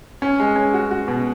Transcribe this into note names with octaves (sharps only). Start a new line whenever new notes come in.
C#4
G#3
C#4
F#4
F#4
B2